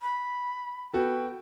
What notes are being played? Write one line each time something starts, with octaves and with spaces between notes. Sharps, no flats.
B5
B3 F#4 A4 G5